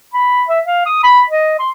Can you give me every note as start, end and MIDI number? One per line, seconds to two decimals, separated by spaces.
0.14 0.43 83
0.48 0.60 76
0.66 0.84 77
0.86 1.00 87
1.04 1.20 83
1.30 1.56 75
1.59 1.71 84